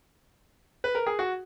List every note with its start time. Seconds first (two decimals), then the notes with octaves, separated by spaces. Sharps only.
0.84 B4
0.95 A#4
1.07 G#4
1.19 F#4